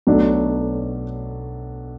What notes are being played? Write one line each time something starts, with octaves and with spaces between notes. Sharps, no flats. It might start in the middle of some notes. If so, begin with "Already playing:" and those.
B1 B2 F#3 A3 D4